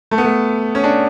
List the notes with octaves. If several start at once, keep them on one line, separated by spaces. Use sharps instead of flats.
A3
B3
A3
C#4
D4